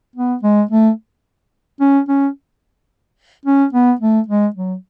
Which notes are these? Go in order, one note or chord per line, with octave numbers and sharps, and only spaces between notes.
B3
G#3
A3
C#4
C#4
C#4
B3
A3
G#3
F#3